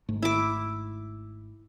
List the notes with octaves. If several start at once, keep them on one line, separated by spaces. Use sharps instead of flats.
G#1 G#2 A3
E4 D6